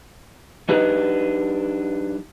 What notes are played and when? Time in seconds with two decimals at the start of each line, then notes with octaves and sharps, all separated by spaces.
0.69 F#3 D4 D#4 G4 B4